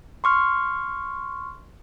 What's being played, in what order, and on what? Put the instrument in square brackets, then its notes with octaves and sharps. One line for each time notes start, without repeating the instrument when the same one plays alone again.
[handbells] C6 C#6 F6